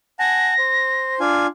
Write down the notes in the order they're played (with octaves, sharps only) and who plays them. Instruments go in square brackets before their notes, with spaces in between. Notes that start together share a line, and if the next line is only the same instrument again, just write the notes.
[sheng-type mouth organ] F#5 G#5 A5 [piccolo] A#6
[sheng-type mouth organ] C5
D4 F4 G#5